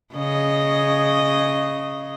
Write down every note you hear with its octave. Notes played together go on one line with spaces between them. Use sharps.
C#3 D#5